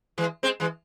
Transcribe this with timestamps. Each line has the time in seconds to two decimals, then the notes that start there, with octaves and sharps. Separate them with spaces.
0.18 E3 G#3
0.43 G#3 C4
0.60 E3 G#3